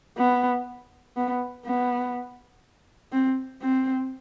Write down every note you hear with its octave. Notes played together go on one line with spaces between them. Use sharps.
B3
B3
B3
C4
C4